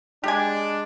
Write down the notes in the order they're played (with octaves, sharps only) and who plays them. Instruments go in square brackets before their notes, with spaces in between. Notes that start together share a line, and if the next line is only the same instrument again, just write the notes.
[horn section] G#3 D4 [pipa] G4 G#5